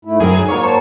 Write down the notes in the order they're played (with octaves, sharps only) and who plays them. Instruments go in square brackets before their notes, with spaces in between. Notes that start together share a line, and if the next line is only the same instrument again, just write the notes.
[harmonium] G#2 A3 E4
[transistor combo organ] F#2 G#4 [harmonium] D3 C4 A#4
[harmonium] G#2
[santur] F#3 A#3 D5 [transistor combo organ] C#5
[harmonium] C5 A5